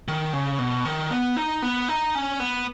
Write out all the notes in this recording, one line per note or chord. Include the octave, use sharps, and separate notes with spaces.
D#3
C#3
B2
D#3
B3
D#4
B3
D#4
C#4
B3